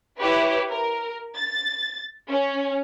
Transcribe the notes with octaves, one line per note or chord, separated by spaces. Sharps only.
E4 G4 B4 C#5
A#4
A6
C#4